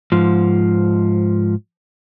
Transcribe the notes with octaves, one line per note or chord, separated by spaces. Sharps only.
G#2 F3